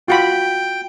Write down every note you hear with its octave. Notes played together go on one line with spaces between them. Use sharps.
F4 F#4 G5 B5